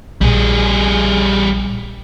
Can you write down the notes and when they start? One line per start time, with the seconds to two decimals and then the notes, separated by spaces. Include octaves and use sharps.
0.21 A#1 G3 G#4